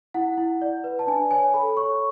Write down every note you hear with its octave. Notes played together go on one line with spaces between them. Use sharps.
E4 F#5
E4
D5
B4
A5
D4 G#5
C#5 G#5
A4 B5
C#5 C#6